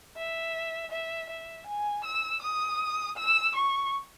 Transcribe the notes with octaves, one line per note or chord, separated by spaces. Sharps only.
E5
E5
E5
G#5
E6
D#6
E6
C#6